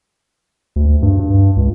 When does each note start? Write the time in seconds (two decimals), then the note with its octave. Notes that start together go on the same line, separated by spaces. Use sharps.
0.76 D2
1.02 G2
1.19 G2
1.56 C#2